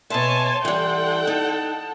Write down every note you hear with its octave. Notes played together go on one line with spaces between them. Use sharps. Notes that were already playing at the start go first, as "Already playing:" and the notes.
B2 C#5 E5 G#5 A5 C6
E3 G3 A4 F#5 G5
D#4 A5